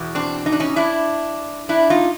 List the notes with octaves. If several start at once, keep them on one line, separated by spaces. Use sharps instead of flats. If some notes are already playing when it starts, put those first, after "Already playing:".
Already playing: E2 B2
C4 D4
D#4
D4
C#4 D#4
D4 E4
D4 E4
D#4 F4